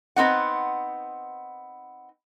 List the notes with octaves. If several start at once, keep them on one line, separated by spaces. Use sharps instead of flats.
B3 C4 D#4 F#5